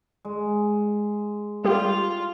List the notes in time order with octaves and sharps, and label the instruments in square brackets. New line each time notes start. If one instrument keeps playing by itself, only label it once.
[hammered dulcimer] G#3
[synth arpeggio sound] G3 G4 [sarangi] F4